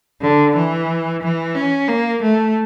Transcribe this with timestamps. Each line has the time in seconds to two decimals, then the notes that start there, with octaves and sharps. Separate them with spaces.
0.21 D3
0.56 E3
1.22 E3
1.55 C#4
1.88 A#3
2.22 A3